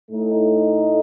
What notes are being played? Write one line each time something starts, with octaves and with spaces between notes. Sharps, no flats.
A2 A3 D#4